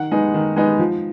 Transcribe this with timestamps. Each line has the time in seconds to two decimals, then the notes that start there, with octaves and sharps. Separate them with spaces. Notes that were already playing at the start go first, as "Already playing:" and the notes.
Already playing: D#3 F#5
0.11 G#3 B3 D#4
0.34 D#3
0.56 G#3 B3 D#4
0.79 F3